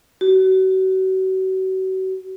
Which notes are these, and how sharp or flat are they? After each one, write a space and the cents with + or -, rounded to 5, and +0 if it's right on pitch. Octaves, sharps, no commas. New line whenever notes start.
F#4 +35